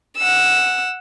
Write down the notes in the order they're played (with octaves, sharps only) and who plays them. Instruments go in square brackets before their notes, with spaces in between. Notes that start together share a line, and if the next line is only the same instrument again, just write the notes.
[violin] F#5 E6